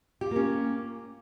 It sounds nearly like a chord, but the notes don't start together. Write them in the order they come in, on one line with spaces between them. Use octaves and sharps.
G4 F4 A#3 C#4